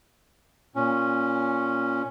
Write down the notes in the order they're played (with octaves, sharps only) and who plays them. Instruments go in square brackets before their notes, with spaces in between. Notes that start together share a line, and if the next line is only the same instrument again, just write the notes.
[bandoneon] A#2 C#4